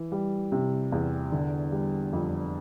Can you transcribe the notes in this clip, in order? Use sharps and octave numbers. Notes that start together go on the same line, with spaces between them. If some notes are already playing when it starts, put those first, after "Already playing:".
Already playing: E3
G3
C3
E2
D3
G3
F2